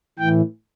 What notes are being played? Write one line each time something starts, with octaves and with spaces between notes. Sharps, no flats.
A2 E3 G5